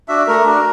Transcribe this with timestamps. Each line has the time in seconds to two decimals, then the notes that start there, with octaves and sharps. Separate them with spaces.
0.08 D4 F#4 E5
0.27 A3 A#4
0.45 D4 F#4